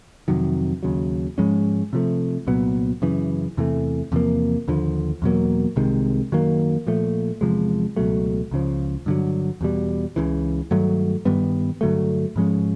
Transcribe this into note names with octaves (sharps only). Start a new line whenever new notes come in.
F2 C3 D#3 F#3
D#2 C#3 F#3
G#2 F3 G#3 C#4
C3 F3 A3
C2 A#2 F#3 B3
F#2 C#3 E3
E2 C3 E3 A3
E2 C3 F3 A#3
D#2 D3 F3
E2 B2 F#3 A#3
C2 C3 D#3 G#3
F#2 D#3 F#3 A#3
A#2 F3 A3
E2 C3 F3 G#3
C#2 B2 F#3 A3
C#2 C#3 F3
G2 D3 F#3
E2 B2 G3
C#2 C#3 E3
G2 D#3 F#3 A3
G2 D#3 G3 B3
G2 D3 F#3 A3
G#2 F3 G#3 C#4